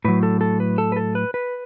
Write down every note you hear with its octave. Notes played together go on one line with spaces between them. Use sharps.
A2 F#3 B4
A4
A4
B4
A4
B4
A4
B4
B4